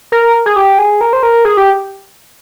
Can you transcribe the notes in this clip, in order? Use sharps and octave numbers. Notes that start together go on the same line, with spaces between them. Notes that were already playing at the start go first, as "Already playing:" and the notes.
A#4
G#4
G4
G#4
A#4
C5
A#4
G#4
G4